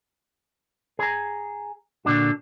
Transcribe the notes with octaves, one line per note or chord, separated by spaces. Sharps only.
G#4 A#5
A#2 D3 D4 F#4